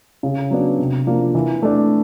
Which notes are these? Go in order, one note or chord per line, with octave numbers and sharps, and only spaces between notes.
C#3
F#3 B3 D4
C3
F3 A#3 D4
E3
A3 D4